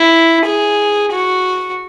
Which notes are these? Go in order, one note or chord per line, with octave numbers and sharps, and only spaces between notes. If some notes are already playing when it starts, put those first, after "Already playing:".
Already playing: E4
G#4
F#4